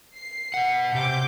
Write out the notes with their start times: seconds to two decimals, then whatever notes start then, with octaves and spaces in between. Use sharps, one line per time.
0.16 C7
0.54 B2 F#5
0.95 C3 D6 G6